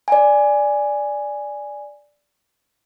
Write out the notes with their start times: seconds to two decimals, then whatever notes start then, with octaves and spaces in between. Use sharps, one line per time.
0.08 D5 G#5